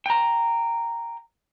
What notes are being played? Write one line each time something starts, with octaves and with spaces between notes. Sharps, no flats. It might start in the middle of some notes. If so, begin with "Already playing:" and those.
G5 A#5